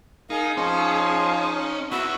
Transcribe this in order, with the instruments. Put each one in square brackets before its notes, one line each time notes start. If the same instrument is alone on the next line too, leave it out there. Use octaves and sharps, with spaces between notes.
[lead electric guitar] D#4 [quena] G#4 [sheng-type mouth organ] A#4 D#5 F5
[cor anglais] F3 [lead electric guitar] C#4 [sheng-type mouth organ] D#4
[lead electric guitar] B3 E4 [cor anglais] F#4 [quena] E6